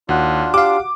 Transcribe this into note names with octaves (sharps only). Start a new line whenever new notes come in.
D#2 D4 F4 F#4 F#5 F#6
G4 F5 D6